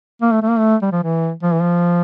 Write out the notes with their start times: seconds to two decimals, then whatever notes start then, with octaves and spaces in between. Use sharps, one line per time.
0.22 A#3
0.32 A3
0.42 A3
0.50 A#3
0.59 A3
0.82 G3
0.92 F3
1.03 E3
1.43 F3
1.53 E3
1.62 F3